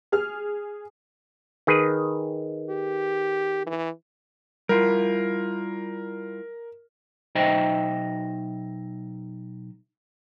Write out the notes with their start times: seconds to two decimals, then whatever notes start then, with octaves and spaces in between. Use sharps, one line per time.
0.12 G#4 F6
1.67 D#3 G#4 B4
2.70 G4
3.67 E3
4.69 G3 E4 F4 A#4
7.35 B1 D#4 C5 D#5 E5 G5